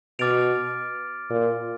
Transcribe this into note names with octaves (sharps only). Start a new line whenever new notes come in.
B2 D6 F6 A6 D7 F7
A#2